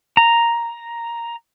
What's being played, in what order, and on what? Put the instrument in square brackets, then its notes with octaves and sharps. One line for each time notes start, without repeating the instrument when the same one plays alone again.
[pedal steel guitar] A#5